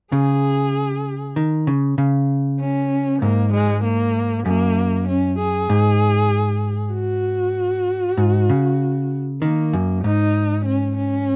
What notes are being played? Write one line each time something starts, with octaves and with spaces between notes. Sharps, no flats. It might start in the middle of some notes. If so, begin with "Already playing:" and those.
C#3 G#4
D#3
C#3
C#3
C#4
G#2 A#3
G#3
A#3
F#2 A#3
C#4
G#4
G#2
F#4
G#2
C#3
D#3 A#3
F#2
G#2 D#4
C#4
C#4